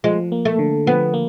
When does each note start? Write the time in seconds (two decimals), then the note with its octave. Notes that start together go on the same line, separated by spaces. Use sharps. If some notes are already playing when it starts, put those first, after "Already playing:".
0.04 F3 G#3
0.32 A#3
0.45 A3
0.59 D3
0.87 F3 B3
1.14 A#3